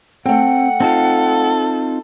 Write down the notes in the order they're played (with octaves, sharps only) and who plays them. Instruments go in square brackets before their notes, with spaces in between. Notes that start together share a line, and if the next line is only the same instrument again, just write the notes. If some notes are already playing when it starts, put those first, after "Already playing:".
[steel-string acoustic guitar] A3 G5 [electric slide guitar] C4 [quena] F#5
[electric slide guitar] C4 D#4 F4 [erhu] A4